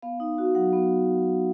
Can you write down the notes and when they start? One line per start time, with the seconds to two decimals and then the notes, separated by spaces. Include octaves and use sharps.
0.02 B3 F5
0.20 D#4
0.38 F#4
0.55 F#3 F#5
0.73 B3